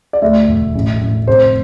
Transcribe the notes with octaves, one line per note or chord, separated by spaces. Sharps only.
D5
D2 E5
E1
A1
A1
F1 C5